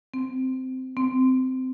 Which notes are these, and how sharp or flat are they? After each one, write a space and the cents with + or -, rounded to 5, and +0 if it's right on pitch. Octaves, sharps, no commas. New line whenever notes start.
C4 -15
C4 -20